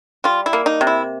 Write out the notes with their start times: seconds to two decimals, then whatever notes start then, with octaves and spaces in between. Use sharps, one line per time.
0.24 G3 F4
0.46 E4
0.53 A#3
0.66 D#4
0.81 C3
0.87 E4